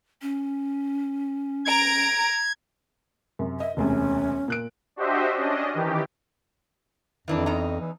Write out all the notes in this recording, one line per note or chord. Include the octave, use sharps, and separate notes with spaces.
C#4
A#5 G#6 D7
F#2 C3
D#5 E5
E1 D2 C3 C#4
A#2 F#6 D7
D4 F#4 G4 C5 D#5 E5
C#4 D4 D#5
D#3 E3 G4
F2 D#3 E3 D4
E2 D#4 A#5
E3